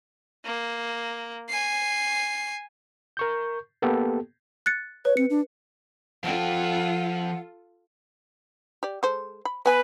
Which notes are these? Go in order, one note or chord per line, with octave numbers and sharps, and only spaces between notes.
A#3
G#5 C7
A#4 C#6 G6
A#3 B3 G4 A4
F#6 A6 C#7
B4 C#5
C4 C#7
D4
F3 F4 A4 F#5 G5
G4 D5
G#3 A4 C5
B5
B3 B4 G#5 B5